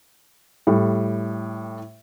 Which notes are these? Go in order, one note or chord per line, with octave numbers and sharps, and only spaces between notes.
A2 G3